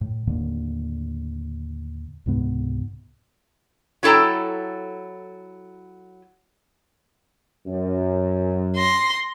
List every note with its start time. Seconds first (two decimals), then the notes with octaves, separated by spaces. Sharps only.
0.01 A2
0.27 D#2 A2 D3 A#3
2.26 C#2 G#2 C3 B3
4.03 F#3 E4 A4 G5 A#5
7.67 F#2
8.76 C6 A#6